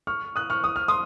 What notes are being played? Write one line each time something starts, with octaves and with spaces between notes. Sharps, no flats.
C#6 F6
D#6 F#6
C#6 F6
D#6
F6
C6 D#6